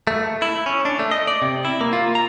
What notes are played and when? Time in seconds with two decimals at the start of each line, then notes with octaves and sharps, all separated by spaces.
0.07 A3
0.42 E4
0.66 C#4
0.85 D4
0.99 A3
1.11 D#5
1.27 D5
1.42 C3
1.65 E4
1.81 A#3
1.93 F4
2.15 A#5